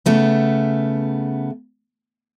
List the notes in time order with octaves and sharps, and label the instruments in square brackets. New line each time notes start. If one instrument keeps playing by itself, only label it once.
[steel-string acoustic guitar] C#3 A3 B3